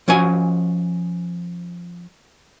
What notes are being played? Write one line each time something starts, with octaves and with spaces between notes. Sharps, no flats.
F3 C#4 F#4 G#5